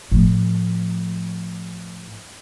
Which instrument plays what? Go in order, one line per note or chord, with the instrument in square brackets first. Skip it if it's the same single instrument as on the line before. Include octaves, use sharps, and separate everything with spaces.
[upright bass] A2 F3